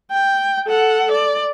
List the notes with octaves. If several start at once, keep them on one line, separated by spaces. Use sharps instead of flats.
G5
A4 F#5
D5